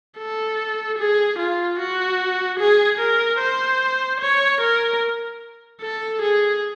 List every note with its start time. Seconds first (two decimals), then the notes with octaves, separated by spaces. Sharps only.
0.18 A4
0.98 G#4
1.38 F4
1.79 F#4
2.59 G#4
3.00 A#4
3.40 C5
4.20 C#5
4.61 A#4
5.82 A4
6.22 G#4